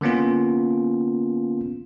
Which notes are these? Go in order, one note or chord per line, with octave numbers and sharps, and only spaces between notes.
D3 A#3 B3 C#4 F4